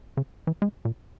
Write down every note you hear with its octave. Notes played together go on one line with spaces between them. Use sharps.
C#3
E3
G#3
A#2